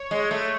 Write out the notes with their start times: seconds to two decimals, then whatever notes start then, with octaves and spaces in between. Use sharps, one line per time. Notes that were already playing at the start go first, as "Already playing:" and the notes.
Already playing: C#5
0.11 G#3
0.31 A3